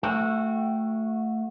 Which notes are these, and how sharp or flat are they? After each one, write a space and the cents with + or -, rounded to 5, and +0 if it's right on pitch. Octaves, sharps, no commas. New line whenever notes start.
A3 +10 F#4 -20 G5 +0